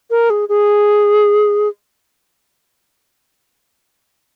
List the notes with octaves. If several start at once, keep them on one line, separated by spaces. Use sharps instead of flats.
A#4
G#4
G#4